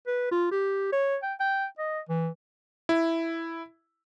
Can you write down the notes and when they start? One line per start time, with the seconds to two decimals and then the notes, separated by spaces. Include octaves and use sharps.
0.07 B4
0.31 F4
0.51 G4
0.93 C#5
1.23 G5
1.40 G5
1.78 D#5
2.09 E3
2.89 E4